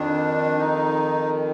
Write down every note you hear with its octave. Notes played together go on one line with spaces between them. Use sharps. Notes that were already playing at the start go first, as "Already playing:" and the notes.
Already playing: F2 D#3 D4
D#4